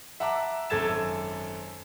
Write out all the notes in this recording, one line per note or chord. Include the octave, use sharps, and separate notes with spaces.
E5 F#5 A5 A#5 D6 E6
G#1 F#2 A4 G#6 A6 E7